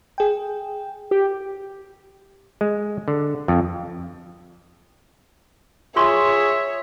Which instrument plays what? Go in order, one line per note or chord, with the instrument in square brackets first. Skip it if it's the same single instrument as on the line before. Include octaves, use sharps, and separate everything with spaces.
[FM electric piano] G#4 G5
[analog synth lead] G4
[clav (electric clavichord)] G#3
D3
F2
[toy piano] F4 C6 C#6 [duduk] G#4 [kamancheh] C#5 [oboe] E5